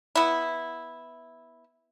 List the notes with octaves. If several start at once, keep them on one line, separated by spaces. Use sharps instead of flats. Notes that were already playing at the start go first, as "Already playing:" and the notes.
B3 E4